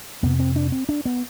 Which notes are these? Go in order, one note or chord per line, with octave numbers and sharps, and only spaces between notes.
F2 C3 B3
C4
D4
C4
D4
B3